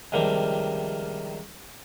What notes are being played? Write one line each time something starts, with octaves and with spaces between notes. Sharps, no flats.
C#2 C3 D#3 F3 G3 A#3